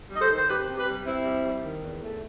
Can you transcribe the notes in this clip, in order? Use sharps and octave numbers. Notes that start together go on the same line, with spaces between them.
G3
D#5
A4 C5
D#3
C5
C3 G4 B4
C3
G4 B4
G3
C3 C4 E4
G3
G3
D#3
E2
A3